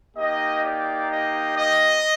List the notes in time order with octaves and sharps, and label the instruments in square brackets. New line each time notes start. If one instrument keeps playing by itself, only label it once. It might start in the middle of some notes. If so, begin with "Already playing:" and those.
[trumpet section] A#3 D#4 G4 D#5
D5
D#5
D#5